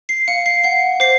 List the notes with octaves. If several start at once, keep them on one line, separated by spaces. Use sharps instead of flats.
C7
F5 C#7
C7
F#5 C7
C5 C7